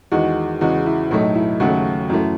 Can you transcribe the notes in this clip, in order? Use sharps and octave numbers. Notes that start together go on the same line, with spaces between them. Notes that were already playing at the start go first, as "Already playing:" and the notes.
E2 D#3 G#3 F#4
E2 C#3 G#3 F#4
E4
B1 A2 F#3 A3 D#4
E4
D#2 C#3 F#3 A3 F#4
F#2 E3 A3